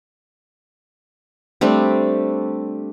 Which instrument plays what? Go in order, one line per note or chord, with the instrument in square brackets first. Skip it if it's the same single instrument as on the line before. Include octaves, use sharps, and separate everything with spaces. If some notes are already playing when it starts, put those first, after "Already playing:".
[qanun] G3 A3 C4 D4